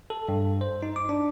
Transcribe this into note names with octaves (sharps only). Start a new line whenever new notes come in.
A4
G2
C5
D#4
D6
D4